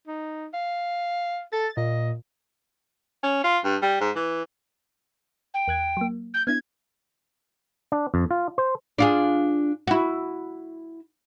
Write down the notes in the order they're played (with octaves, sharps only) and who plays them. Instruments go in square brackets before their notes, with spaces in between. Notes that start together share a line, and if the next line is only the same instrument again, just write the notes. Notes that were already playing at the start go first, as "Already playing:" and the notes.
[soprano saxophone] D#4
F5
[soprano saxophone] A4 [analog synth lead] A6
[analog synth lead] A#2 [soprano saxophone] D#5
[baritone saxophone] C#4
F4
G2
G3
G#2
E3
[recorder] G5
[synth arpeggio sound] E2 F#6 G#6
F#3 A#3
[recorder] G6
[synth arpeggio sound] B3 D4 E4 [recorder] G#6
[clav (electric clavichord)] D4
F2
F4
C5
[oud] D4 F4 G#4
E4 F#4